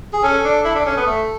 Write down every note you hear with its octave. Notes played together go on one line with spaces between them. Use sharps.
G#4
C#4 A4
D4
E4 A4
D4
C#4
B3
A3